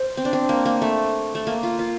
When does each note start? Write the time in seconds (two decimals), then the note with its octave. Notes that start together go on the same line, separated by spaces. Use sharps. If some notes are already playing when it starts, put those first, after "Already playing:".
Already playing: C5
0.17 C4
0.25 D4
0.33 C4
0.49 A#3
0.65 A#3
0.82 A3
1.35 A3
1.47 A#3
1.63 F4
1.79 F4